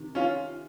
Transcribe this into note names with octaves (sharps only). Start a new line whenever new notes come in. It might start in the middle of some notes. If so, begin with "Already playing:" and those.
Already playing: C3 D#3
C#4 F4